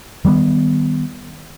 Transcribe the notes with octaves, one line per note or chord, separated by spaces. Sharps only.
D#3 G3 A3 B3